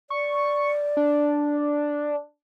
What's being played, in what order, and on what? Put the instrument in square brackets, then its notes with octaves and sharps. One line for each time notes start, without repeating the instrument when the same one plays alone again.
[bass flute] D5 [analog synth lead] C#6
[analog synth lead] D4